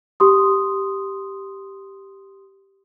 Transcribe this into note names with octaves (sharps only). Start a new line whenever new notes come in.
G4 C6 D#6